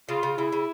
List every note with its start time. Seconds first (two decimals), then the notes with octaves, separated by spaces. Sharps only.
0.08 C#3 F4
0.23 C#3
0.38 C#3 E4
0.52 C#3